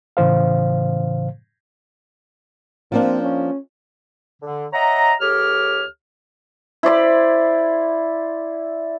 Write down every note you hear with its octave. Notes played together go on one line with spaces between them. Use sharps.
A2 C#3 E3 C5 F5
F3 A#3 C4 D4
C#4
D3
C#5 D#5 E5 F#5 A#5
C#2 G4 A4 C#5 F6
E4 C5 D5 B5